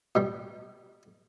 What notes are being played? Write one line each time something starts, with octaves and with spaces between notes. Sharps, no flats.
B2 G3